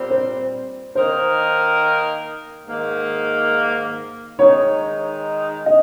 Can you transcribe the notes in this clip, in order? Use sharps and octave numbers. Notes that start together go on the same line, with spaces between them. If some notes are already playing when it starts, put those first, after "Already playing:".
Already playing: A#2 G3 C4
C5
D#3 A#3 D#4 A#4 C5
G#2 D#3 A#3
D#3 G#3 D#4 C#5
D#5